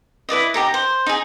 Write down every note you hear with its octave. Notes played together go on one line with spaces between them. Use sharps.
E4 B4 D5 D#5
D#4 G4 A4 A#5
C5
D#4 G#4